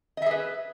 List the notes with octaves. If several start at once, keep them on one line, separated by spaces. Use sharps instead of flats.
G#4 B4 D#5 E5